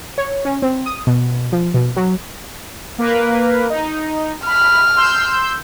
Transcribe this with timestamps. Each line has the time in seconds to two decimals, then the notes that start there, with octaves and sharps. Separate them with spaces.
0.18 C#5
0.45 C#4
0.62 C4
0.86 D#6
1.07 B2
1.52 F3
1.74 B2
1.96 F#3
2.98 A#3 A#4 B4
3.70 D#4
4.46 B5 F6
4.97 C6 E6 G6